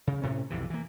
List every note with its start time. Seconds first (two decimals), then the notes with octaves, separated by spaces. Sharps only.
0.07 C#3
0.22 A2 C3 C#4
0.50 B1 F2 C3 E3
0.70 E3 A#3